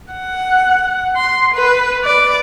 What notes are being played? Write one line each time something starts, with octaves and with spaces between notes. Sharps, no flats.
F#5
C6
B4
D5